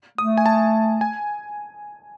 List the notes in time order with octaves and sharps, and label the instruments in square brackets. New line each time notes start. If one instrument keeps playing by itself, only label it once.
[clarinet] A3 [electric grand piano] D#6
[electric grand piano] G#5
A5
G#5